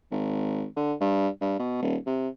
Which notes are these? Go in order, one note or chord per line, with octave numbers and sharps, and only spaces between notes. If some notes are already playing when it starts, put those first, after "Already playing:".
G#1
D3
G2
G2
B2
D#1
C3